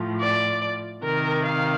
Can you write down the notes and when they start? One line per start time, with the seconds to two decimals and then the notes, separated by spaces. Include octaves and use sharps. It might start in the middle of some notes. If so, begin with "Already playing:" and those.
Already playing: A2 F3
0.22 D5
1.04 C3 D#3 A#4
1.45 F5